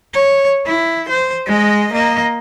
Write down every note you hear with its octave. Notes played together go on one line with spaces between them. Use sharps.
C#5
E4
C5
G#3 D#5
A#3 D#5